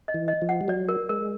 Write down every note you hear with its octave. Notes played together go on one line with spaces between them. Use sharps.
D#5
E3
D#5
F3
F#5
G3
F#3 D5
A#4
G#3 A#4